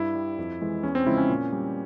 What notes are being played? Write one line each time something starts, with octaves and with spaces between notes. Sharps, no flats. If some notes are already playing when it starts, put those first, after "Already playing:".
Already playing: G2 E4
G3
F2
E3 G#3
E2 C#4
C4
C#3 F3 G#3 E4
C#4
A#2
G3